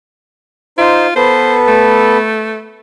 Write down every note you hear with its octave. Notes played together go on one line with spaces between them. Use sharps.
D#4 F4 C5
B3 A4 B4 C5
A3